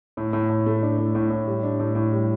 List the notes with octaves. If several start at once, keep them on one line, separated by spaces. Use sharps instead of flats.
A2
A2
A2
A3
D4
A2
A2
A2
G3
D4
A2
A2
G3